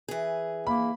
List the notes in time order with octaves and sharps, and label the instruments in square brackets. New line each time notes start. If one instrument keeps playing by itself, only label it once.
[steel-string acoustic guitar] E3 G#4
[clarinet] A#3 [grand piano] B5